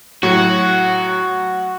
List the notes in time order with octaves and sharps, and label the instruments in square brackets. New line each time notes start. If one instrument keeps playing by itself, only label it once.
[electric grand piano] A2 F#3 [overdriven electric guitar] F#4